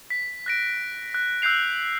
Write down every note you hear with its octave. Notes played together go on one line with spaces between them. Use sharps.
B6
F#6 A#6 D7
F#6
E6 F#6 G6 C7 F7